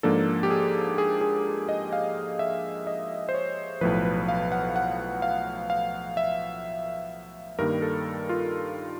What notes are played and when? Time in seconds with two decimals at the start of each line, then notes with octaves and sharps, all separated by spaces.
0.03 G#2 F3 A#3 D4 A4
0.43 G4
0.50 G#4
0.98 G#4
1.21 G#4
1.69 D#5
1.93 F5
2.39 E5
2.87 D#5
3.29 C5
3.34 C#5
3.81 B1 A2 F3 B4
4.05 B4
4.29 F5
4.52 F#5
4.76 F#5
5.22 F5
5.70 F5
6.17 E5
7.59 G2 D#3 G3 A#3 A#4
7.82 A4
8.29 F4